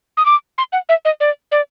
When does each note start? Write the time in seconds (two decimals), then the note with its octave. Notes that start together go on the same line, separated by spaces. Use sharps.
0.17 D#6
0.26 D6
0.58 C6
0.73 F#5
0.89 E5
1.05 D#5
1.20 D5
1.52 D5